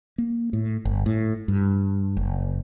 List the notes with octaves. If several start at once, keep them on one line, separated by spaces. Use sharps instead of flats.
A#3
A2
G1
A2
G2
F#1